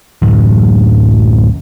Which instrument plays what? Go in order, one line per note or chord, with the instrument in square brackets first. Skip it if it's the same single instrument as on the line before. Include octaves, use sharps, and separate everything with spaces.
[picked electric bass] D1 A1 F#2